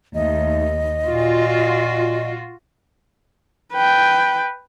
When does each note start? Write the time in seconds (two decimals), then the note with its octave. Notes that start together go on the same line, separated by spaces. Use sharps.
0.15 D#2 A3 D#5
1.06 A#2 F4 F#4
3.73 B4 G5